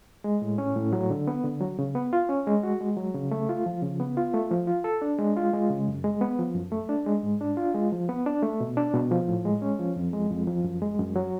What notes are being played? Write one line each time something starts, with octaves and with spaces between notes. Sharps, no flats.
G#3
A2
C#4
A2
F#3
D3
B3
D3
F#3
C#3
B3
F4
C#4
G#3
F#4
G#3
F#3
C#3
A3
F4
F3
C#3
B3
F4
A3
F3
F4
A4
D4
G#3
F4
G#3
C#3
F#2
G#3
B3
F3
F#2
A3
D4
G#3
G#2
D4
F4
G#3
F3
B3
D4
A3
B2
D4
B2
F3
A2
G#3
C#4
F3
F2
G#3
F2
F3
F#2
G#3
F#2
F#3